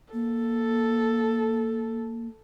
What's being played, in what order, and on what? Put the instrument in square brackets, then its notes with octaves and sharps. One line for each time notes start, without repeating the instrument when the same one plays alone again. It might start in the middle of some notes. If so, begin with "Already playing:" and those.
[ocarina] A#3 [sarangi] A4